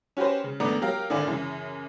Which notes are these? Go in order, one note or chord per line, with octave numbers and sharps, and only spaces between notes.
C#4 F#4 G4 B4 C5
C#3
G#1 A3 B3 D4 D5 A#5
F#3 G4 A#4 F5
G#1 D3 E4 D5 F5 G#5
F#2 C#3 E3